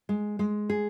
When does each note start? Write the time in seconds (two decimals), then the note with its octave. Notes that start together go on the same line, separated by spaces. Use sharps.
0.09 G#3
0.39 G#3
0.70 G#4